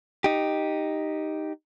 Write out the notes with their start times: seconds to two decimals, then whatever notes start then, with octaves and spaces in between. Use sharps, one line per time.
0.24 D#4 G4